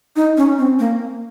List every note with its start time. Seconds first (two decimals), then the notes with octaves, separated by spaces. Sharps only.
0.16 D#4
0.37 C#4
0.58 C4
0.79 A#3